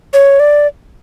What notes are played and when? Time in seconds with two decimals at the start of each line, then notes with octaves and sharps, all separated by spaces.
0.13 C#5
0.40 D5